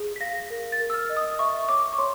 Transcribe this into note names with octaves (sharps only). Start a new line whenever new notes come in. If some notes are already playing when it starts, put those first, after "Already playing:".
Already playing: G#4
B6
F5 A#6
A#4
A6
A#4
E6
F6
D#5
D#6
E5 C#6
C#5 D6
C#6
C#5 C6